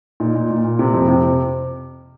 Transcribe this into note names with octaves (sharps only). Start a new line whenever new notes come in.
A#2 D#4
A#2
A#2
A#2
C3
F2
C3